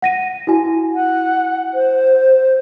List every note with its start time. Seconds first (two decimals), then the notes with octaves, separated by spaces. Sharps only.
0.02 F#5 A#6 D#7
0.47 E4 F#4 G#5
0.95 F#5
1.74 C5